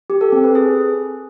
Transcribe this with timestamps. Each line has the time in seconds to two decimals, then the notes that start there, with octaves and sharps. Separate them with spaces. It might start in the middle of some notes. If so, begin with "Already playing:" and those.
0.10 G4
0.21 A4
0.32 C4
0.44 B4
0.55 G#4